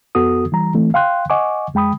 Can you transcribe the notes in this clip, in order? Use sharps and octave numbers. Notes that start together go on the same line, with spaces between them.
F2 B3 F#4 A4 D#6
E3 G3 A#5
E3 A3 C4
F5 G5 C6 F#6
D#5 F#5 G#5 C#6 D6
F2 G#3 G5 B5 D#6